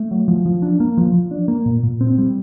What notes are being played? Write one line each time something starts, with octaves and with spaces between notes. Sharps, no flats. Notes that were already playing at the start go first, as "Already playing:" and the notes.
Already playing: A3
F#3
F3
F3
D4
A#3
F3
F3
D4
A#3
A#2
A#2
C4
G3